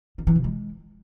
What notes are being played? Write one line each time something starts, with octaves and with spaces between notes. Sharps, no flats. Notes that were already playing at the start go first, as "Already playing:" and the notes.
D#3
E3
C3
G#3